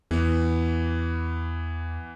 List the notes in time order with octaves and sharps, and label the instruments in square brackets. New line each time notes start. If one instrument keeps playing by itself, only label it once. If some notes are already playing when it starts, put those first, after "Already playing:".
[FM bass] E2 [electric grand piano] E3 B3